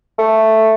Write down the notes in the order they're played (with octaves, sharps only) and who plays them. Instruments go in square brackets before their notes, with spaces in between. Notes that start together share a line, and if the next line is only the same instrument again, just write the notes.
[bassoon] A3